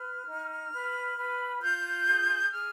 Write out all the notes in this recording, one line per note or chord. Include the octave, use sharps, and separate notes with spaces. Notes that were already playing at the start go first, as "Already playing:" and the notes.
Already playing: B4 F6
D#4
B4
B4
F4 G6
G#4
G#4 F6